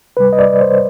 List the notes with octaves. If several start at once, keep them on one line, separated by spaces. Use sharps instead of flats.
D2 C3 G3 B4
D#5
D5
C5